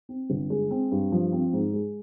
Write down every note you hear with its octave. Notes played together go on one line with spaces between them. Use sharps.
C4
G1
G#3
C4
G2
F3
C4
G#2
G#3